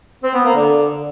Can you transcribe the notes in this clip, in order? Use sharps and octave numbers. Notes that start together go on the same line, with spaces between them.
C4
B3
A#3
D3